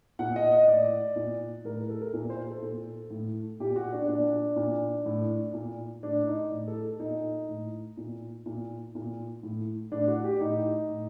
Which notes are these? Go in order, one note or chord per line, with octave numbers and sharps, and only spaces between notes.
A#2 F#5
D#5
F#5
D#5
A2 D5
A#2
A2 A#4
A#4
A4
A#4
A#2
C5
A4
A#2
A2
A#2 G4
F#4
D4
A#2 D4
A#2
A2
A#2
A2 D4
D#4
A2
A4
A#2 D#4
A2
A#2
A#2
A#2
A2
A2 D4
F#4
G4
A2 D#4
A2